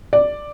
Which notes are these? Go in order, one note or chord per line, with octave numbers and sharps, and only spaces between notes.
D5